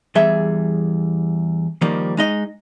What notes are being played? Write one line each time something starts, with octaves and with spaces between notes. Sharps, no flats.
E2 G3 G#4 E5
D#3 F3 G3 A#3
G#3 D#4 D#5